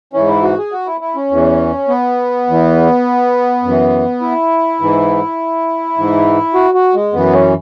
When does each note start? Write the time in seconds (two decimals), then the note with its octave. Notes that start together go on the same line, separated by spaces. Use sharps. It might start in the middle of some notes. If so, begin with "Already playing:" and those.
0.13 G#2 E3 C#4
0.28 E4
0.42 F#4
0.58 G#4
0.72 F#4
0.87 E4
1.01 E4
1.16 C#4
1.31 E2 E3
1.88 B3
2.47 E2 E3
3.63 F#2
3.68 E3
4.21 E4
4.81 G#2 E3
5.97 G#2 E3
6.54 F#4
6.74 F#4
6.94 G#3
7.13 F#2 E3 B3
7.33 C#4